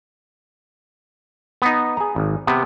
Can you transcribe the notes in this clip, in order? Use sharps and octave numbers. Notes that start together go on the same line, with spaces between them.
B3 D#4
G#4 A#5
G#1
C3 B3